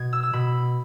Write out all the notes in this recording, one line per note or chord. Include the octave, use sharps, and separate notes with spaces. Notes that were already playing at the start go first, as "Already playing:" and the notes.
Already playing: B2 G#6
E6
E6
B2 B5